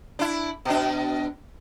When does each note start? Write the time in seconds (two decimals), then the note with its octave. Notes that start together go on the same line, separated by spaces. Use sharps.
0.19 D4 E4
0.65 B2 D4